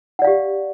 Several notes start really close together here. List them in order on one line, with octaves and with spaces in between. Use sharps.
F#5 D5 F5 G4